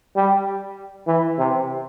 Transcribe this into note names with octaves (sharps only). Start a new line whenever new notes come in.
G3
E3
C3